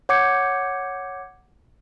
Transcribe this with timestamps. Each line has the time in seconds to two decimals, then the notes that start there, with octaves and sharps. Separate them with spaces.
0.09 C#5 F#5 D6 G6 G#6 C#7